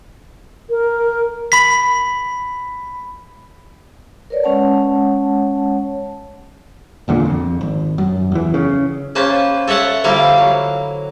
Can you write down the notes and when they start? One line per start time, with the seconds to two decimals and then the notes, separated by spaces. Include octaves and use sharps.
0.70 A#4
1.52 B5 B6
4.30 A#4 B4 C#5 D5
4.44 G#3 C#4 C#5 F#5 A5
7.08 G1 E2 A#2 D3
7.25 F2
7.61 G#1
7.98 F#2
8.32 E2 E3
8.54 C#3
9.15 A#3 C#4 B4 C5 A5
9.68 A4 C#5 E5 F#5 A5
10.04 D3 F3 G3 A#3 E4 F5
10.38 F#3